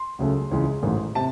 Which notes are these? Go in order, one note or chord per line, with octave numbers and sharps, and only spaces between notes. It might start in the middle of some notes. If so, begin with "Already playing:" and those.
Already playing: C6
C#2 C#3 F#3 A3
C#2 C#3 E3 G#3
A1 G#2 D#3 A3
C3 A5